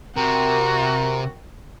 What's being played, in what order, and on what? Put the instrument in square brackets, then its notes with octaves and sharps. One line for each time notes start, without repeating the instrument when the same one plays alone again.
[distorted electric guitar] C3 [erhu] F#4 [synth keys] A#4 G5 [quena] A#5